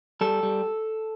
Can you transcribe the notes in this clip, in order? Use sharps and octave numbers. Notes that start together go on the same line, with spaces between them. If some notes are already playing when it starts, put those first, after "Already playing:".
G3 A4
G3